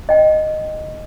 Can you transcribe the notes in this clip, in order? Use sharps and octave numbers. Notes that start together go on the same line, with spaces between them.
D#5 G5